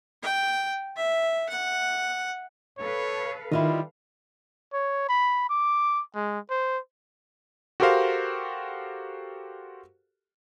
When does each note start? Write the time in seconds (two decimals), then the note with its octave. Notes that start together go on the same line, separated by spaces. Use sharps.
0.23 G5
0.97 E5
1.49 F#5
2.78 A4 B4 C#5 F5
3.52 D#3 G3 E4 F4 D#5
4.73 C#5
5.09 B5
5.50 D6
6.15 G#3
6.50 C5
7.80 F#4 G4 A4 A#4 C5 F5